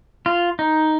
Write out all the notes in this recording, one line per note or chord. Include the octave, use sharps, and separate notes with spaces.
F4
D#4